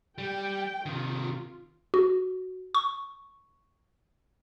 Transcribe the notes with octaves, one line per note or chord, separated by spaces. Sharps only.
G3 G5
C3 D#3 F4
F#4
C#6